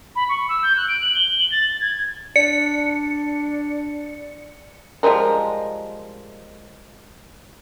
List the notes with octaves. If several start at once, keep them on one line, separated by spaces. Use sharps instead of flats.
B5
C#6
E6
G6
F#6
D7
F#7
G7
F#7
A6
A6
G#6
D4 D5 C#7
F3 G3 G#3 A#4